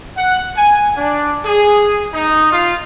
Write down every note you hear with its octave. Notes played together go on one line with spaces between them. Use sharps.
F#5
G#5
D4
G#4
D#4
F4